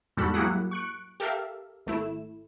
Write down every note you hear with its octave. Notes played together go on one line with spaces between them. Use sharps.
E2 G#2 G3 F#4 A4 B5
F#3 A#3 E4 G4 G#4 F#5
C#6 F#6 D7
G4 A4 A#4 E5 F5
G#1 A3 E4 E7